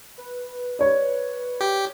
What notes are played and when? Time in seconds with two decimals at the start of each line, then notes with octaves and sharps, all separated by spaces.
0.18 B4
0.79 C#5 D5
1.61 G4